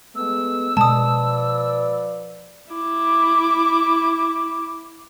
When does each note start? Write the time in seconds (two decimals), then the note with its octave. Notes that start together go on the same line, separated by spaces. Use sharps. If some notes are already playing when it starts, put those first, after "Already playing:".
0.15 G#3 A3 B3 E6
0.77 B2 F3 G#3 B4 D5 A5 D#6
2.71 E4 D6